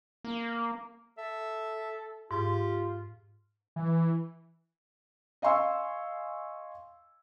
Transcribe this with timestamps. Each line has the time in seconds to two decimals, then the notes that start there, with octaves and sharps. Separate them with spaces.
0.24 A#3
1.18 A4 E5
2.31 G#2 F4 G4
3.76 E3
5.42 D#5 F5 G#5 C6 C#6 E6